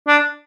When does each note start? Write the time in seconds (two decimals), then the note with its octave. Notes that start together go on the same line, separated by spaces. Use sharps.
0.08 D4